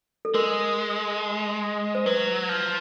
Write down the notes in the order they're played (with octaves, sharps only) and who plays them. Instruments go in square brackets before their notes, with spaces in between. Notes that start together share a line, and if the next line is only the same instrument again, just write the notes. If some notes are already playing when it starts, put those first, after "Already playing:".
[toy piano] A4
[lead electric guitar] G#3 [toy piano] A#4
[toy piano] C5
[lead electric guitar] F#3 [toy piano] B4
[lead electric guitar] F3